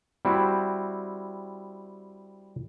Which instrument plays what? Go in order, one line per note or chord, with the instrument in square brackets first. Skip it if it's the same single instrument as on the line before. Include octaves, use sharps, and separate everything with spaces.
[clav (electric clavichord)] G3 C4 E4 F#4